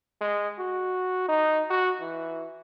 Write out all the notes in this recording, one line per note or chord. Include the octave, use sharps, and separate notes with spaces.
G#3
F#4
D#4
F#4
E3